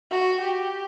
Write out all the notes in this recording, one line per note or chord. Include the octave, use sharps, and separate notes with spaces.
F#4
G4